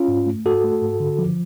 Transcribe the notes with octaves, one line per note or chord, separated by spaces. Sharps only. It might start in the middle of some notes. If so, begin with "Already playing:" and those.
Already playing: C#4 F4
G#2
A3
G#2 F#4 A4
A3
G#2
D3
F3